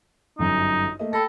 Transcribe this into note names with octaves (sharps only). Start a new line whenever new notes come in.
G1 F#2 D#4
A3 A#3 D#5
A4 G5 B5 A#6